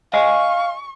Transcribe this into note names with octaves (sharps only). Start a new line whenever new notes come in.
D#5 F5 G#5 C#6